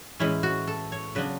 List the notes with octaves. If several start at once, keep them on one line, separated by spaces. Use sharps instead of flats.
A2 E3 G#3 C#4 E4
F#4
A4
C#5
C#3 F#3 B3 D4 B4